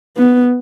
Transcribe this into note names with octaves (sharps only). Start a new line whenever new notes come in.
B3